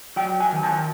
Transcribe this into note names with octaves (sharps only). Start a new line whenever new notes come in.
F#3 G5
G#5
D#3
A5